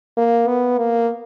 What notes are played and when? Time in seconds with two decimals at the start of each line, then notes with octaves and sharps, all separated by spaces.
0.17 A#3
0.48 B3
0.78 A#3